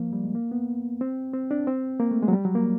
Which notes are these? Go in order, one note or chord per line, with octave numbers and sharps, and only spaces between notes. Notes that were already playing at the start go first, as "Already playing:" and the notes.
Already playing: F3 A#3
G3
G#3
A#3
B3
C4
C4
D4
C4
A#3
A3
G#3
F#3
G3
F#3
A#3